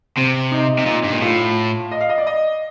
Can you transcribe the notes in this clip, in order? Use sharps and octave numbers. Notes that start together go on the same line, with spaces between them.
C3 C4
D#4
C3
A#2
G2
A#2
A2 F4
D#5
F5
D#5
D5
D#5